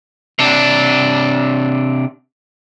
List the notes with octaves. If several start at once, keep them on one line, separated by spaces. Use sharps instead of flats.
C3 D4